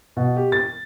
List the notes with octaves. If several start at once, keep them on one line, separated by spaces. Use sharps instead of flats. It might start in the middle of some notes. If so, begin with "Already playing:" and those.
B2
G4
A6